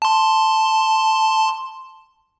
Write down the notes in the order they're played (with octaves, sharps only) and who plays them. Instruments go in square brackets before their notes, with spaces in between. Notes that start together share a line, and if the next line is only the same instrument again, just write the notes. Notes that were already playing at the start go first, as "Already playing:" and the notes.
[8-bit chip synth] A5 C6